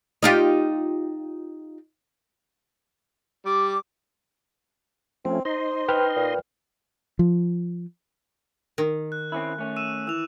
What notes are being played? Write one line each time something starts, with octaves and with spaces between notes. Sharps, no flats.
D#4 F4 G4
G3 D6
F3 A3 C4 C#4
D#4 C5 D#5 C6
B4 G5 F6
A#2
F3
D#3
F#6
C4 C#4 E4
A3 C#4
E6 D#7 E7
E3 E6 F7